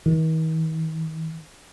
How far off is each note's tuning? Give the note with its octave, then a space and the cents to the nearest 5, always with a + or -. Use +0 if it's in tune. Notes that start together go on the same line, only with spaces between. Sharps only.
D#3 +45